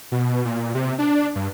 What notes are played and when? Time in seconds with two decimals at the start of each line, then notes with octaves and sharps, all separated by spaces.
0.12 B2
0.45 A#2
0.75 C3
0.99 D4
1.35 G2